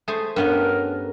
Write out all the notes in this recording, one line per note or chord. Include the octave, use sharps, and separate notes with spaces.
A3 G#4 C5
G2 B3 C#4 A#4